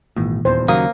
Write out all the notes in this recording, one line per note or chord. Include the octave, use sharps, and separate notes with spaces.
G#1 A#2 E3
D#1 E2 C5
D#2 C#3 F#3 A#3 D#6